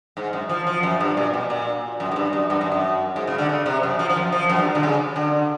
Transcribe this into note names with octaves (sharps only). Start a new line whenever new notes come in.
G#2
F#2
F3
F3
F#2
G2
A#2
B2
A#2
F#2
G#2
G2
F#2
G2
F#2
F#2
G#2
C#3
D3
C#3
C3
F#2
F3
F3
F#2
F3
F#2
G2
D3
C#3
D3